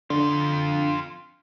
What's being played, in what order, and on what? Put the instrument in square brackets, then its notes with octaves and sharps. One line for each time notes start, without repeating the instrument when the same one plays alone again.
[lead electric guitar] F2 F4 [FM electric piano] D3